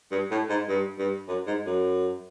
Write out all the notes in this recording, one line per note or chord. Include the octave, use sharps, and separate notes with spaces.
G2
A2
G#2
G2
G2
F#2
G#2
F#2